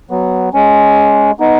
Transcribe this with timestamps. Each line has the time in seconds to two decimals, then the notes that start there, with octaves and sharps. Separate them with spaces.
0.11 F#3 B3
0.54 G#3 C#4
1.40 B3 D#4